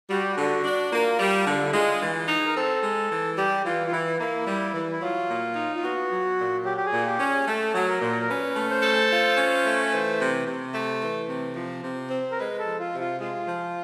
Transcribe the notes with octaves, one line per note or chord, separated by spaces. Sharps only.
G3 F#4
G4
F#4
D3
D4
A#3 F4
G3
D3
E4
G#3 F4
E3
D#4
A#4
C4 A4
G#3
E3
G3 G4
E3 F4
F4
E3 E4
A#3 E4
G3
E3
E4
F#3 F4
A#2
D#4
F4
B3 F#4
F#3
A#2
F#3 G4
G4
G#4
A#2
G4
C#4
G#4
A3 A4
F#3
A#4
A#2
A#4
C#4 B4
A3
C5
A4
F4
C#4
A3
E3 C5
C3
C3
A3
E3
C3
F3
C3
C4
A#4
G#3 B4
A4
F3
F4
C3
F4
G#3 F4
F3